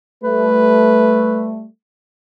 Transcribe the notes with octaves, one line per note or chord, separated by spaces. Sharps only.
G3 A3 B4